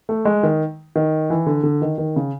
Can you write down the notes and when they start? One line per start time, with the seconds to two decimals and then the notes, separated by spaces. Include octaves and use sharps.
0.09 A3
0.25 G#3
0.43 D#3
0.96 D#3
1.30 E3
1.46 D3
1.63 D3
1.82 D#3
1.98 D#3
2.16 C#3